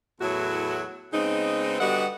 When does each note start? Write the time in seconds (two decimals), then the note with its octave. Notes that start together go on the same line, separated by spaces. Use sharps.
0.21 E2 A2 F#3 E4 F#4
1.13 C#3 G#3 B3 C4 D#4
1.80 D3 G3 B3 F#4 D#5 F#5